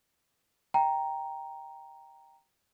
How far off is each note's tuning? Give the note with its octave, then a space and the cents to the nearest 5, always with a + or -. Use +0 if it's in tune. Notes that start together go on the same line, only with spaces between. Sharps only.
D#5 +15 G5 +0 A#5 +0